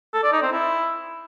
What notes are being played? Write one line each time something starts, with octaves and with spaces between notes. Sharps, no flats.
A4
D5
D#4
C4
E4